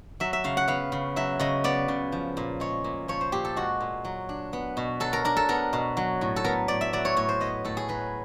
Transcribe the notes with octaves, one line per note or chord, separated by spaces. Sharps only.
F#3 E5
E5
C#3 F5
F#5
B3 F5
C#3
F#3 E5
C#3 D#5
B3 D5
C#3
F3
A#2
G#3 C#5
A#2
F3 C#5
C5
A#2 G4
A4
G#3 F#4
A#2
F#3
D4
B3
B2
F#3 A4
A#4
D4 A#4
A4
B3 A#4
B2
F#3
A2
A4
B3 A#4
A2 D5
E5
F#3 D5
C#5
A2 C#5
C5
B3 D#5
A2 A4
G#4
F#3 B4